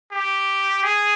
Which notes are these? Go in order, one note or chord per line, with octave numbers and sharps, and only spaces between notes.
G4
G#4